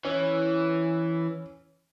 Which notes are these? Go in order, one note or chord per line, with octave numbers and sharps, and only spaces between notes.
E3 C#4